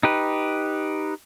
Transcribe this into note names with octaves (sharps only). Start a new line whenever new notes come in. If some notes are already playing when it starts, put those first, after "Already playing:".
D#4 G4 B4